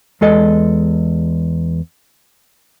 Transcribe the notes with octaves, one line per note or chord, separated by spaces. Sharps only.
E2 G#3 A4 D#5